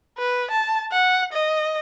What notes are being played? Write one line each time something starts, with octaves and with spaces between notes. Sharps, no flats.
B4
A5
F#5
D#5